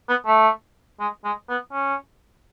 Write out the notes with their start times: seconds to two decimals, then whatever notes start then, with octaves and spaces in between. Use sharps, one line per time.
0.09 B3
0.26 A3
1.00 G#3
1.25 G#3
1.49 B3
1.73 C#4